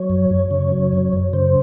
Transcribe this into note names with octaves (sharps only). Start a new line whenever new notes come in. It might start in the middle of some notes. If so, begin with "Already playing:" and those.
Already playing: F#3 C#5
F#2
F#2
C#3
F#3
F#2
F#2
C#3 C5